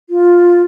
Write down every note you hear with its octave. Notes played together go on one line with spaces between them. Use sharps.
F4